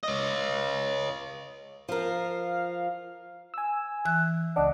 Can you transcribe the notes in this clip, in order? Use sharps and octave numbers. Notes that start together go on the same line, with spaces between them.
C#5 D#5
F3 A#4 F5
G#5 E6
E3 F#6
C#2 D4 D#5 F#5